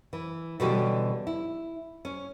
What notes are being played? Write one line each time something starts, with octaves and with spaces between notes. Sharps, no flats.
E3
B2 D3 E3 G3 C#4 G4
E4
C#4